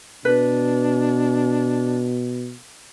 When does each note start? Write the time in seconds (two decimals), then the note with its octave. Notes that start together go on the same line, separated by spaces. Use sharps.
0.25 B2 D4 B4